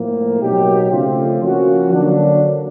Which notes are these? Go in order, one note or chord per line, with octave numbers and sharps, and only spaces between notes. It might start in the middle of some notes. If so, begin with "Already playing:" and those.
Already playing: A2 F3 A#3
B2 F#3 A#3 D#4 G4
C#3 F3 A3 C4 F4
F3 A#3 C#4 F#4
D3 F#3 A#3 D4